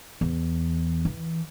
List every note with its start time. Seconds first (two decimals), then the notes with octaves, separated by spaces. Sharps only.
0.21 E2
1.05 E3